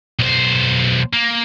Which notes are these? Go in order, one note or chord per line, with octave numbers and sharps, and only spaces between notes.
B1 C5
A#3